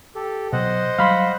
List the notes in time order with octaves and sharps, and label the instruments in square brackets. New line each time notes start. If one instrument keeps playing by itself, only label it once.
[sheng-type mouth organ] G4 A4
[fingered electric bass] B2 F#3 [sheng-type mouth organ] C5 D#5 F#5
[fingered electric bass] F#3 G3 [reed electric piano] F5 B5 C6